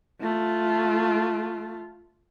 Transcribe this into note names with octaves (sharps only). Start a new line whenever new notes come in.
A3 F4